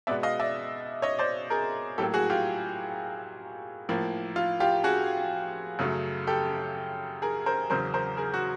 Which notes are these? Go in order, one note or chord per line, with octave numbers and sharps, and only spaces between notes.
B2 G#3 B3 D5 E5
D#5 F5
D5 E5
C#5 D#5
C5 D5
G#4 A#4
A2 F#3 A#3 G4 A4
F#4 G#4
F4 G4
A2 F3 A#3
F4
F4 G4
F#4 G#4
F#2 C#3 F#3 A3
G4 A4
G#4 A#4
A#4 C5
E2 C#3 F#3 A#4 C5
A#4 C5
G#4 A#4
F#4